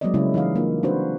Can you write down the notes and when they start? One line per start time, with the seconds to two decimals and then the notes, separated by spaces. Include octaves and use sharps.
0.01 F#3 G#3 A#3 C4 D5 D#5
0.14 C#3 G3 G#3 C#4 E4
0.34 E3 D#4 D#5 F5
0.56 A#3 D4 F4
0.83 C4 D4 D#4 F#4 B4 C5